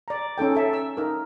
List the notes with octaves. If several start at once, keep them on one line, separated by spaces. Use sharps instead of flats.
D5 A#5
C#4 D#4 A4 G5
A4 E5 A5
E6
D#4 A#4